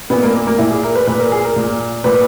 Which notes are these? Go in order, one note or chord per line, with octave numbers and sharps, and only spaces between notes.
A#2 B3
A#3
A#3
A#3
A#2 E4
G#4
A#4
B4
A#2 B4
A#4
G#4
A#4
A#2
A#2 B4